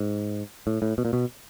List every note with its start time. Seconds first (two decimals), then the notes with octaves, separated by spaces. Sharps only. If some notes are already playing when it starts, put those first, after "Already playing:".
Already playing: G#2
0.67 A2
0.82 A2
0.98 B2
1.05 A#2
1.13 B2